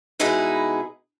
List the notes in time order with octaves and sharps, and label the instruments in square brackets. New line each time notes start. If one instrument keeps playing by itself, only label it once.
[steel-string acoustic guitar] B2 G#3 D#4 E4 G#4 B4